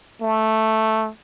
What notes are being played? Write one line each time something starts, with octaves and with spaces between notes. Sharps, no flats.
A3